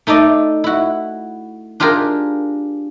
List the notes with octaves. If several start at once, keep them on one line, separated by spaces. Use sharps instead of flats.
A3 D#4 A4 D5 D#5
E4 F#4
D4 F4 G4 G#4 A#4